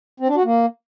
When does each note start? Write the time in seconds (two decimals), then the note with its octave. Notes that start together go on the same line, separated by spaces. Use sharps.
0.20 C4
0.28 D4
0.36 F#4
0.45 A#3